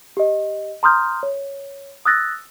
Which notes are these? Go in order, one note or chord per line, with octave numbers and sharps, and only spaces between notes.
G4 D#5
A#5 C6 D#6 F6 G6
C#5
D#6 E6 F#6 A6 A#6